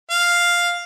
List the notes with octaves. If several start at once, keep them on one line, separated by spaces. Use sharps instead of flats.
F5